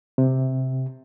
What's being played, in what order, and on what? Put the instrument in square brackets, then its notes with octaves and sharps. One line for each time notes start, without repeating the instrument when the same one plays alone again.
[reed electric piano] C3